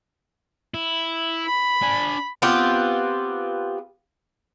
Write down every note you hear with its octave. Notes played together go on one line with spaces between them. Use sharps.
E4
B5
D4 G#5
B3 C4 F4 G4